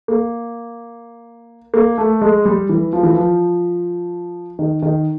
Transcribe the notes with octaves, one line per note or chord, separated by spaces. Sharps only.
A#3
A#3
A3
G#3
G3
E3
F3
E3
F3
D#3
D#3